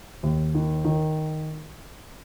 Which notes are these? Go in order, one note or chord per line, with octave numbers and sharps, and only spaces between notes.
D#2
D#3
D#3